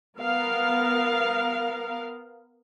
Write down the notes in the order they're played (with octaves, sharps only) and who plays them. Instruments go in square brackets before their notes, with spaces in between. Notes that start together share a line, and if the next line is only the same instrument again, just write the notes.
[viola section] B3 A#4 F5